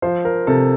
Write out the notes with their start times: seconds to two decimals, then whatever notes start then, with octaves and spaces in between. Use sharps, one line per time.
0.02 F3 C5
0.25 A#4
0.47 C3 A4